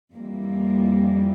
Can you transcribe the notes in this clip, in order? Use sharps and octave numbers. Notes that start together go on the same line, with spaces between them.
F2 E3 G3 A#3